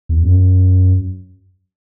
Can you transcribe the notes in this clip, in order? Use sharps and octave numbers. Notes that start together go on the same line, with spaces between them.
E2
F#2